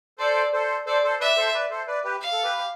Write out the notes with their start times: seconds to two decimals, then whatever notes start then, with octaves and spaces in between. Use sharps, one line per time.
0.19 A4 C5 D5
0.53 A4 C5
0.86 A4 C5 D5
1.03 A4 C5
1.20 B4 D5 E5
1.37 A4 C5
1.54 B4 D5
1.70 A4 C5
1.88 B4 D5
2.04 G4 B4
2.21 F5
2.33 A4
2.44 G4 B4
2.58 G4